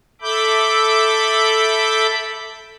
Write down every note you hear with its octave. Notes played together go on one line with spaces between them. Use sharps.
A4 E5 B5 D6 G6